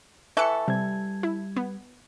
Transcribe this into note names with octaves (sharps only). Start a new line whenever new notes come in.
E3 A4 E5 C#6 F#6 C#7
C3 G3 G#6
E4
B3